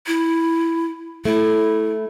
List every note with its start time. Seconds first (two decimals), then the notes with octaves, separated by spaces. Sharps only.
0.07 E4
1.25 A3 E4